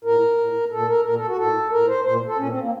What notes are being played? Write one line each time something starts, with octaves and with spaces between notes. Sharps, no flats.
A2 A#4
A2
A#2 A4
A#4
A#2 A#4
A4
F#4
A2 A4
A2 A#4
C5
A#2 C5
A4
A#2 C#4
C4
A#3